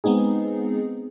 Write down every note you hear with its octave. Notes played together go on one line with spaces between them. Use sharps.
G#3 B3 C4 D#4 G#4